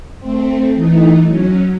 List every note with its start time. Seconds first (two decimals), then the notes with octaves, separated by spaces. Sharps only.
0.19 A3 C4
0.74 E3 A3 D#4
1.25 F#3 C#4